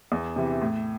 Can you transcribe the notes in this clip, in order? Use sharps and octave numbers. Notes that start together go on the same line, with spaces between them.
E2
C3 E3
A2